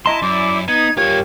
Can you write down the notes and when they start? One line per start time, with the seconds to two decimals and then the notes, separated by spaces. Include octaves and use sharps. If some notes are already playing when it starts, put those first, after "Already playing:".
0.06 E4 D#5 A5 A#5 C6
0.22 F#2 E4 D5 D6
0.68 B3 D#4 G#6
0.97 G2 F4 G4 A#4 C#5 G#6